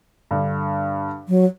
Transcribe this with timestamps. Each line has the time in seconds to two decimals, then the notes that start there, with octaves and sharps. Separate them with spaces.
0.31 G2 D3
1.29 F#3